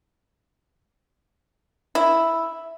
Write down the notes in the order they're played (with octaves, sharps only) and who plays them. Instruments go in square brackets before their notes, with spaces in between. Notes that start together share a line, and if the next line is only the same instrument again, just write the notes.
[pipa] E4